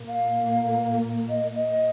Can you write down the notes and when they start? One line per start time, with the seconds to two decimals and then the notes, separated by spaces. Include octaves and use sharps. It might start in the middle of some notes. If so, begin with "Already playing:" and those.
Already playing: A#2 A#3
0.08 F5
1.29 D#5
1.55 D#5